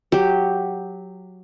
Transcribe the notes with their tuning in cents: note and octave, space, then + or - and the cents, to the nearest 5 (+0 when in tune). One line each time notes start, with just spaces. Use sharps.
F#3 -5 G4 +0